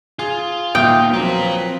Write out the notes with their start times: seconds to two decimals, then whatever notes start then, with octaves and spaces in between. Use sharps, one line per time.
0.19 F4 G#4
0.75 D#2 A#2 A#3 B3 D#4 G5 D#6
1.13 F3 F#3 C4 F4 A#4 B4